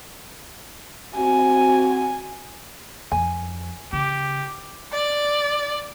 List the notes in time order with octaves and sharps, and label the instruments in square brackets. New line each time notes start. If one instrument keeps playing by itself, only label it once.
[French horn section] C4 F#4 [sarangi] G#5
[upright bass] F2 [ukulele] G#5
[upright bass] C#3 [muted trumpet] G4
[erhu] D5